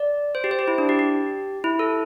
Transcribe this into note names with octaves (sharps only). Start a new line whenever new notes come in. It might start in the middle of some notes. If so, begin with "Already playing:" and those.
Already playing: D5
C5
G4
C5
G4
E4
D4
G4
G4
E4
A4